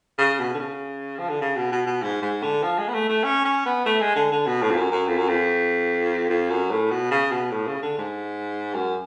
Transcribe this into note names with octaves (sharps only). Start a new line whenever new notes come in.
C#3
B2
D3
C#3
F3
D3
C#3
B2
B2
B2
G#2
G#2
D3
F3
G#3
B3
A3
A3
C#4
C#4
B3
A3
G#3
D3
D3
B2
A2
F2
F#2
F#2
F2
F#2
F2
F2
F#2
A2
B2
C#3
B2
A2
C#3
D3
G#2
F#2